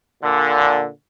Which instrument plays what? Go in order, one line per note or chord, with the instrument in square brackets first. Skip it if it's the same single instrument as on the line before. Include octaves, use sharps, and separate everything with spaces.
[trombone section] A#2 D3